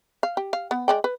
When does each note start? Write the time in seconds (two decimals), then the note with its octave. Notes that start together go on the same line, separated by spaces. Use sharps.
0.23 F5
0.37 G4
0.53 F5
0.71 B3
0.88 G#3 D5 G5
1.04 B4